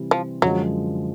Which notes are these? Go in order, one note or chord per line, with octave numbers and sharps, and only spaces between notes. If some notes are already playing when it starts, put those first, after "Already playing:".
Already playing: C3 E3 G3
F3
F#2 D3 F3 F#3 G#3